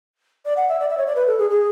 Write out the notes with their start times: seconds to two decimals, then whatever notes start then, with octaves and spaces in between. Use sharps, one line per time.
0.45 D5
0.57 F#5
0.69 E5
0.80 D5
0.89 E5
0.98 C#5
1.07 D5
1.16 B4
1.27 A4
1.38 G#4
1.50 G#4